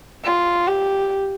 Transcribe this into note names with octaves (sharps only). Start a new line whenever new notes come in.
F4
G4